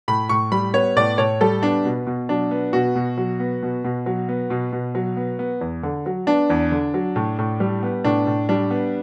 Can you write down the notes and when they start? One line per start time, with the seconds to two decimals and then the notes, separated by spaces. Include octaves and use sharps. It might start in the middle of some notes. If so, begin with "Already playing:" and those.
0.08 A2 B5
0.29 A2 C#6
0.52 G3 B5
0.74 B3 C#5
0.96 A2 D5
1.18 A2 C#5
1.41 G3 A4
1.63 B3 D4
1.85 B2
2.07 B2
2.29 F#3 D4
2.51 B3
2.73 B2 F#4
2.95 B2
3.17 F#3
3.40 B3
3.62 B2
3.84 B2
4.06 F#3
4.29 B3
4.50 B2
4.72 B2
4.95 F#3
5.17 B3
5.39 B3
5.61 E2
5.83 D3
6.06 F#3
6.27 B3 D4
6.50 E2
6.72 D3
6.94 F#3
7.16 A2
7.39 A2
7.60 G3
7.83 B3
8.04 A2 D4
8.27 A2
8.49 G3 D4
8.71 B3